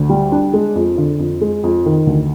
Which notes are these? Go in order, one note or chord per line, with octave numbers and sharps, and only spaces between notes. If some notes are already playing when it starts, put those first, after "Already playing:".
Already playing: D2
G3
D4
G#3
F2
D3
F2
G#3
F2
D#3
D2